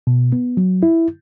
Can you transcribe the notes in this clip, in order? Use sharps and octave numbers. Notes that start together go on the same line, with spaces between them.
B2
B3
F#3
E4